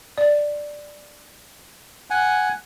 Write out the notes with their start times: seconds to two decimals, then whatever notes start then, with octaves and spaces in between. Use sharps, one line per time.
0.18 D5
2.10 F#5 G#5